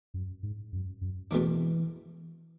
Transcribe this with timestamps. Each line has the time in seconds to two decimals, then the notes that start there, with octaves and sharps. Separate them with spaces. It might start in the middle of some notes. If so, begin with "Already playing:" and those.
0.14 F#2
0.43 G#2
0.73 F#2
1.01 F#2
1.31 E2 B2 E3 A3 D4